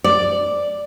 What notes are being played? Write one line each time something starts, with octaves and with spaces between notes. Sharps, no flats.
D5